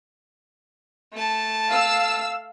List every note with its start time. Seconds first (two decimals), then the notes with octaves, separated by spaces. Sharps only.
1.13 A3 A5
1.69 F5 E6